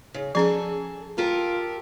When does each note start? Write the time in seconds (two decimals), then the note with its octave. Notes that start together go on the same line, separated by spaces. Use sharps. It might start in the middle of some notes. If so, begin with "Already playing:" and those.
0.14 C#3
0.35 F3 C#4 G#4 A4
1.18 F4 G4 A4 A#4